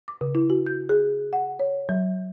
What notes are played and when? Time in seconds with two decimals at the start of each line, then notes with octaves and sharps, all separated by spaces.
0.08 D6
0.21 C#3
0.35 E4
0.50 F#4
0.66 G6
0.89 G#4
1.33 F#5
1.59 C#5
1.89 F#3